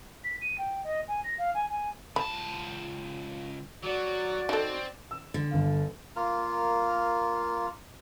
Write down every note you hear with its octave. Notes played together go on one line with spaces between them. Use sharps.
B6
D#7
G5
D#5
G#5
A#6
F5
G#5
G#5
C#2 A5 B5
F#3 F#4 D5
C4 D#4 A4
E6
D3
G1 F5
A#3 F4 A#4